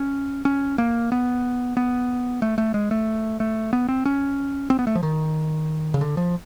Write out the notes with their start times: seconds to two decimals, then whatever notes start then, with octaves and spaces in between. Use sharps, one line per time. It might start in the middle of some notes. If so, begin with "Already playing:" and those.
Already playing: C#4
0.45 C#4
0.78 A#3
1.12 B3
1.77 B3
2.42 A3
2.58 A3
2.74 G#3
2.91 A3
3.40 A3
3.73 B3
3.89 C4
4.06 C#4
4.70 C4
4.79 B3
4.87 A3
4.95 F3
5.03 D#3
5.94 C#3
6.01 D3
6.17 F3